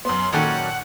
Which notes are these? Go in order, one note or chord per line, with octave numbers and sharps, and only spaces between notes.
F#2 B3 C6
A#2 D#3 F#3 C#4 A4 F#5 G5